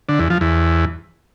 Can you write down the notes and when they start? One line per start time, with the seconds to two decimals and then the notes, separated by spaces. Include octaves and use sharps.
0.09 D3
0.19 E2
0.30 F3
0.41 E2